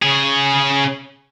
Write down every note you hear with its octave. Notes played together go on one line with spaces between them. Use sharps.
C#3 G#4